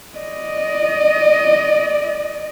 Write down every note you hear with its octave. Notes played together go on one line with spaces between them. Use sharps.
D5 D#5